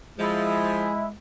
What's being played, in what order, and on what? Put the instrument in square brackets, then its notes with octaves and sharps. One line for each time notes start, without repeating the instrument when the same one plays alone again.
[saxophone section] F3 [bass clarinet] G#3 [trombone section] E4 [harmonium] G#4